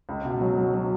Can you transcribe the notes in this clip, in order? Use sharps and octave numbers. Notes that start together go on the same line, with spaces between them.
C#2
B2
F#3
F#3
F#3